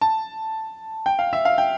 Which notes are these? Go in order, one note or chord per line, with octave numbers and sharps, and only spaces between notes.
A5
G5
F5
E5
F5
G5